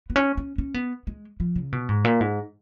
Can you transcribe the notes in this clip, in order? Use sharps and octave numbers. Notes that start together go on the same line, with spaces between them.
B3
C#4
C#4
C#4
B3
G#3
F3
C#3
B2
G#2
A#2
G#2